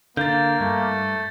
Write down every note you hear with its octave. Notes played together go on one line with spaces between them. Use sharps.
D3 A#3 F5 G6 A6
G2 A3